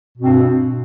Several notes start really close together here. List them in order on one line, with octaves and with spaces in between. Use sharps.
B2 G2 C4